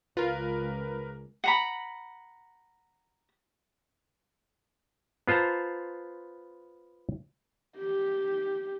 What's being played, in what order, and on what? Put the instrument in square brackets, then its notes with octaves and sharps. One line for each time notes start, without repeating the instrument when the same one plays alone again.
[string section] C#2 [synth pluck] F4 [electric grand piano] A#4 B4
[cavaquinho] F#5 A#5 B5
[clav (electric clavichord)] B3 F4 C5 A5 A#5
[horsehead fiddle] G4